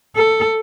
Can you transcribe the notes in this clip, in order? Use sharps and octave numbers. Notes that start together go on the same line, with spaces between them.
A4